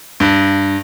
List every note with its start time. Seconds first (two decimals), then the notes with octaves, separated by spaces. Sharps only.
0.20 G2